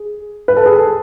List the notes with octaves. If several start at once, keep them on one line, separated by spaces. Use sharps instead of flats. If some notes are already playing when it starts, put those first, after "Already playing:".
Already playing: G#4
B4
A4
G#4
A4